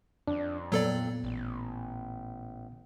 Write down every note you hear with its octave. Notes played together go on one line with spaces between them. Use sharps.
F2 D4
A#2 F#3 B3 A4 D5
A1